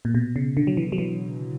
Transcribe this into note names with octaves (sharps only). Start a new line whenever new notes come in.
A#2
B2
C#3
D3
F#3
E3
F#3
E3